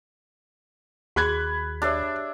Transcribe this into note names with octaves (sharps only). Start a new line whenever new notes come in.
D#2 F#4 G#4 B5 F#6 G#6
D4 G4 C#5 E5